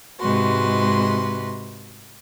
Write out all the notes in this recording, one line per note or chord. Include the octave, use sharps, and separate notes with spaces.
G#2 C3 G#3 F#4 B4 C6